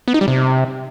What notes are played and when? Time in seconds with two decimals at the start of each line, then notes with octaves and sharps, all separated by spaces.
0.08 B3
0.14 D#4
0.21 G3
0.28 C3